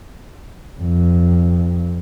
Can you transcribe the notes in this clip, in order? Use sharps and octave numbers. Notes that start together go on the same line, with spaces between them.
F2